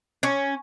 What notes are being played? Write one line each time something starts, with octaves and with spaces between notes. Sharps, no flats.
C#4